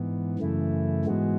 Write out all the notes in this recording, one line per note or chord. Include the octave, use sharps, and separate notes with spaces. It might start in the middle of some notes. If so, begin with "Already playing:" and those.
Already playing: G#2 E3 B3
F#2 C#3 E3 A3 E4
G#2 E3 G#3 B3 F#4